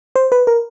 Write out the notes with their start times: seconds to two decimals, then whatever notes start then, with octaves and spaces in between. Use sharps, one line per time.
0.16 C5
0.32 B4
0.47 A#4